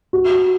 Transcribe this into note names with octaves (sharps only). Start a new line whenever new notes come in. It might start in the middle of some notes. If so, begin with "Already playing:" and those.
F#4